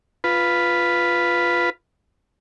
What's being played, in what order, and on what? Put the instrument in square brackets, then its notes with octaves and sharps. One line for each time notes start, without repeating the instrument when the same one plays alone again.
[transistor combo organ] F4 B4